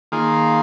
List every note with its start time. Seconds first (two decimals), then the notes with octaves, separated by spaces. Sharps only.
0.12 D#3 A#3 F4 G#4